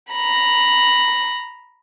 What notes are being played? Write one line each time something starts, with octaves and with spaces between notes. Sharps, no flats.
A#5 B5